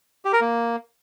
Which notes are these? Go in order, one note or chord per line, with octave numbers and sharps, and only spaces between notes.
G4
A#4
A#3